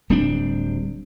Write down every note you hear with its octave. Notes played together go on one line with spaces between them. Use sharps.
D1 G3 C4 D4